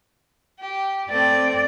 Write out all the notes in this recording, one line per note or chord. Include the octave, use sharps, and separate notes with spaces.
G4
A3 C4 D5